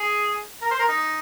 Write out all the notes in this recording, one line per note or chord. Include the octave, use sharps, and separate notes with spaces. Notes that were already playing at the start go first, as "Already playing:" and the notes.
Already playing: G#4
A#4
C5
A#4
D#4